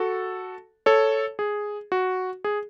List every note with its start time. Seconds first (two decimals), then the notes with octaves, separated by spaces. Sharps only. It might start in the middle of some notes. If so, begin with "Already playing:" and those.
Already playing: F#4 A4
0.86 A4 C#5
1.39 G#4
1.92 F#4
2.44 G#4